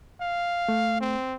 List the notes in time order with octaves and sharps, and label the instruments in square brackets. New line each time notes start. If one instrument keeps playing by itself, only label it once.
[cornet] F5
[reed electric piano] A3
[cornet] C4